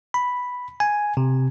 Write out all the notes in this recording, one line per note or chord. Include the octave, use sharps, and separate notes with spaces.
B5
G#5
C3